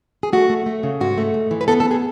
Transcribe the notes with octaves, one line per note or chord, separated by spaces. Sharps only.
G#4
A3 F#4
A3
A3
C#3
G#2 F#4
A3
G#2
E3
B4
B3 A4
A4
B3
G#4